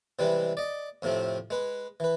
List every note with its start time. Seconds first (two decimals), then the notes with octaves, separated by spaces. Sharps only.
0.19 C3 E3 G3 G#3 B4
0.57 D5 D#5
1.02 F2 A2 C3 F3 C4
1.50 G#3 B4
2.00 E3 B4